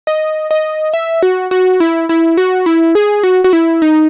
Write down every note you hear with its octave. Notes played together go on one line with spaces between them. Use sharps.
D#5
D#5
E5
F#4
F#4
E4
E4
F#4
E4
G#4
F#4
F#4
E4
D#4